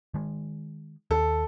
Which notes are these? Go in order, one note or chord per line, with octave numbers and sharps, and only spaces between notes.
D#3 G#3
D#2 A4